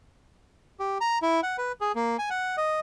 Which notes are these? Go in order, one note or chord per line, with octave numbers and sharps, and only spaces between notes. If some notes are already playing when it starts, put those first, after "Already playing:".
G4
A#5
E4
F#5
B4
G#4
A#3
G#5
F#5
D#5